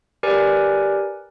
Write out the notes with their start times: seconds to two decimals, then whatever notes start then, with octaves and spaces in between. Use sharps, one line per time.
0.23 G4 A#4 B4 D5 G#5